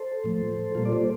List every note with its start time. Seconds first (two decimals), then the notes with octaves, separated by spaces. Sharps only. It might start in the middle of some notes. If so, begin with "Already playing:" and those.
Already playing: A4 C5
0.24 A2 F3 A3
0.75 A#2 G3 A#3 F4 A4
0.85 D5
0.92 A4 C5